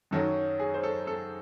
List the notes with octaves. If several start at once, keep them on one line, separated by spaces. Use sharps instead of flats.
F#2 D#3 F#3 A4
G#4
C5
A4
A4